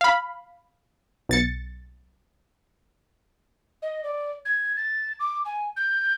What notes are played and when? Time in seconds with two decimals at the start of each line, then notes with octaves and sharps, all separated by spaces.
0.01 F5 B5
1.29 B1 A6 C#7
3.82 D#5
4.04 D5
4.45 G#6
4.77 A6
5.20 D6
5.45 G#5
5.77 G6